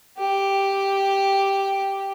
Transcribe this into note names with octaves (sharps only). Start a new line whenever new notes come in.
G4